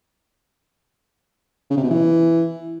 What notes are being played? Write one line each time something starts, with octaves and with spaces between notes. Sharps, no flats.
C#3
C3
B2
E3